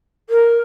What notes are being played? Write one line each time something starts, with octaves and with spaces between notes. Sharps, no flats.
A#4